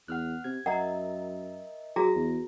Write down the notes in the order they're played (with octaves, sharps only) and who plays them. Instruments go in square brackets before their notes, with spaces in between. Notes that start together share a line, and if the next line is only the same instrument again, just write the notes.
[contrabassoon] E2 [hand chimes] F#5 F6 F#6
[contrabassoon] C3 [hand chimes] G#6
[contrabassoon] F#2 [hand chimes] A#4 D#5 E5 [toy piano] F#5 A#5
[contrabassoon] F#3 [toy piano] F#4 G#4 A#5 [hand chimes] A#6
[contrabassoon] E2